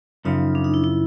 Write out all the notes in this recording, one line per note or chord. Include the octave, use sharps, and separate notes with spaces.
F#2 C#3 F3 D#4
D4
D#4
E4
E4